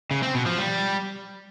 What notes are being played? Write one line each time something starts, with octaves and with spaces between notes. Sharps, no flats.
C#3
C4
B2
F3
G3